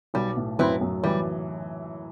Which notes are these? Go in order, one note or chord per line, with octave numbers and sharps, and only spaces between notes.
B1 B2 G3
A2
F#2 F#3 C4 E4 B4
F#2 F#3
E3 G3